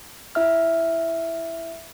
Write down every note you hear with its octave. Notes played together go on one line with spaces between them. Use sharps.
E4 E5 F6